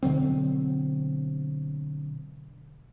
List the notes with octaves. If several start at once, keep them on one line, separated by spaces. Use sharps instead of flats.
B2 D3 F#3 C4